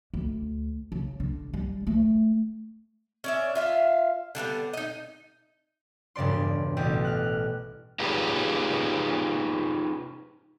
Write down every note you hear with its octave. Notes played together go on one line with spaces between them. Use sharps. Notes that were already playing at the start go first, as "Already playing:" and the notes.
D2
C#3
D3
G3
A3
C#4 D5 E5
F4 E5 F5
D3 G3 A#3 B3
D#4 D#5
E1 G2 C#3 D5 C6
A1 B2 G4 D#5
F6 F#6
D#4 F4 G4 G#4 B4